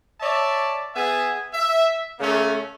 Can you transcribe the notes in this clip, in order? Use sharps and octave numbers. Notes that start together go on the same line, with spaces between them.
C#5 D5 E5 A5
B3 G#4 E5 G#5
E5
C#3 A3 A#3 C#4